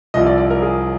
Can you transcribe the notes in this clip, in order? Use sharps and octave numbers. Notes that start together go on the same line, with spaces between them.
C2 C3 F3 D#5
D5
D5
A#4
G#4